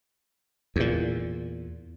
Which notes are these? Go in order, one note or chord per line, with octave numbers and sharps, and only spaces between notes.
E2 A#2